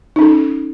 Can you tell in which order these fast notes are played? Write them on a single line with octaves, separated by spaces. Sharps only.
D#4 C#4 A4